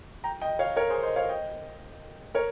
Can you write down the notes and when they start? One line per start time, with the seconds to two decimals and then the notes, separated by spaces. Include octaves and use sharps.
0.24 G5 A#5
0.41 D#5 G5
0.59 C#5 F5
0.76 A#4 C#5
0.90 G#4 C5
1.03 C5 D#5
1.16 C#5 F5
1.29 D#5 G5
2.35 A#4 C#5